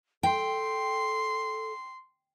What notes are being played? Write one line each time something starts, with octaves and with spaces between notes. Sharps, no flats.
A4 G5 C6